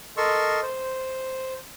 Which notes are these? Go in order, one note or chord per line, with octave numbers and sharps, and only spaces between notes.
A4 A#4 D#5 C6 C#6 E6
C5